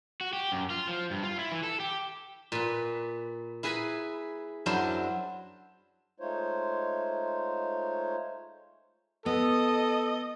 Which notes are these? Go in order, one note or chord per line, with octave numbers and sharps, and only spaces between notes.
F#4
G4
F#2
F4
F3
G2
F4
E4
E3
A4
G4
A#2 B4
E4 G#4 B4 G#5 A#5 B5
F#2 F#3 D4 E4 C5 C6
G#3 A3 D#4 F4 C5 C#5
B3 A4 D#5